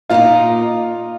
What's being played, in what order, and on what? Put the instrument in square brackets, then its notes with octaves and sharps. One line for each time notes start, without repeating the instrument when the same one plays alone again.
[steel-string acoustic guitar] A#2 A#3 D#4 [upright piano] F4